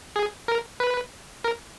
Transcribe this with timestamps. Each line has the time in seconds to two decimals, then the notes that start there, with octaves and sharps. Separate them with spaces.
0.16 G#4
0.48 A#4
0.80 B4
1.44 A#4